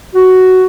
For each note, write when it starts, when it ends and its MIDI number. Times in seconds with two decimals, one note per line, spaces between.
0.14 0.65 66